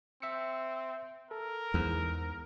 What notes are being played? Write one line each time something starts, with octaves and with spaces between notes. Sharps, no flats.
C4 E5 E6 C#7
A4 A#4
E2 G#2